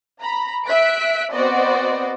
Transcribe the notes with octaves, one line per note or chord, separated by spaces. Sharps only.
A#5 B5
E5 F#6 B6 D7
B3 C4 F#4 C5 D5 D#5